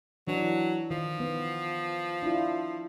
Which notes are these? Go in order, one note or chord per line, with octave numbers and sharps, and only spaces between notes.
E3 F#3 D4
D#3 F3
B3
D4 E4 F4